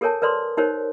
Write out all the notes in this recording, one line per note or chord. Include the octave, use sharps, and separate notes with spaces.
G4 A4 A#4 C#5 G#5 A5
A#4 B4 D5 C6 D#6
D#4 G4 A#4 C5 C#5